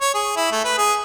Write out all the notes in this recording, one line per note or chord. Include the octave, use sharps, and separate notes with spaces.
C#5
G#4
E4
A3
B4
G#4